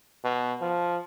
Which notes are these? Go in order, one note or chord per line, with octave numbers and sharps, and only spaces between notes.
B2
F3